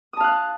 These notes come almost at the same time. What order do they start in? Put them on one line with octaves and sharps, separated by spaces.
D#6 A5 F5 F#6